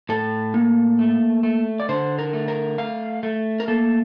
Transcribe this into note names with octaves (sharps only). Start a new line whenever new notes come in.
A2 A4
A#3
A3
A3
D5
D3 C5
A#4
A3
A#4
A3 F5
A3
A#4
A#3 A4